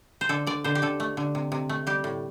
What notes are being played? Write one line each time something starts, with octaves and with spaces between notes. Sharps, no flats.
C5
D3 A4
D3 D5
D3 C5
G4
D3 A4
A3
D3
C3
C3
A3
G3 G4
A2